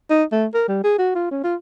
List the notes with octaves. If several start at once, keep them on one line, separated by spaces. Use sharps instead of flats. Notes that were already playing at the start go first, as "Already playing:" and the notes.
D#4
A3
A#4
G3
G#4
F#4
F4
C#4
F4